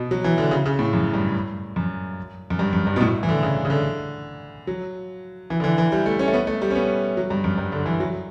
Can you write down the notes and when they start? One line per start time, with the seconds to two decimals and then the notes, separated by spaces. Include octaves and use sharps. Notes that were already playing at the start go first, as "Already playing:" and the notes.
Already playing: B2
0.11 F#3
0.24 E3
0.38 D3
0.51 C#3
0.66 C#3
0.79 A2
0.93 F#2
1.14 G2
1.76 F#2
2.50 F#2
2.59 G2
2.73 F#2
2.87 G2
2.96 B2
3.01 A2
3.23 E3
3.29 D3
3.43 C#3
3.65 C#3
3.70 D3
4.67 F#3
5.50 E3
5.60 D3
5.64 E3
5.78 E3
5.92 G3
6.06 A3
6.19 C#4
6.28 A3
6.34 B3
6.47 A3
6.62 G3
6.71 C#4
6.75 B3
7.17 F#3
7.30 G2
7.44 F#2
7.58 G2
7.72 D3
7.86 E3
8.00 F#3